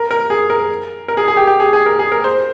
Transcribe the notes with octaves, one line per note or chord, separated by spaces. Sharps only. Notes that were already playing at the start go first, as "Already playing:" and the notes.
Already playing: A#4
A#4
G#4
A#4
A#4
G#4
G#4
G4
G4
G#4
G#4
A#4
G#4
A#4
C5